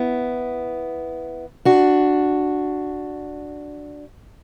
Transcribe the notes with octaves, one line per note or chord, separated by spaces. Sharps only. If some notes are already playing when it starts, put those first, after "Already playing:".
Already playing: B3 E4
D4 F#4